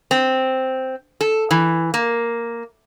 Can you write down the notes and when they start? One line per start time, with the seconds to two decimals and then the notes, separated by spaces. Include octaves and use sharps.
0.11 C4
1.21 A4
1.51 E3
1.94 A#3